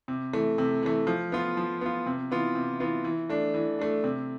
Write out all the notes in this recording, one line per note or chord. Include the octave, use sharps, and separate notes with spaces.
C3
E3 A3
C3
E3 A3
F3
B3 F4
F3
B3 F4
C3
E3 B3 F4
C3
E3 B3 F4
E3
A3 D4
E3
A3 D4
C3